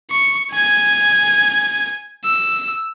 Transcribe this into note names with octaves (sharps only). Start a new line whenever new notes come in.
C#6
G#5 G#6
E6